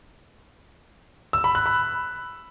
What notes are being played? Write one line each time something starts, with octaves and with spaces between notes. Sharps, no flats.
E6
B5
F#6
B5